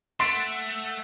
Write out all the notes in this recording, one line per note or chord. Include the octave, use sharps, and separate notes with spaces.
A3 F#5 C6 E6 A6 B6 D7